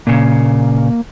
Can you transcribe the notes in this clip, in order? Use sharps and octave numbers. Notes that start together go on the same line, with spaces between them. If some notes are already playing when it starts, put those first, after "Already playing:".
A#2 C#3 A#3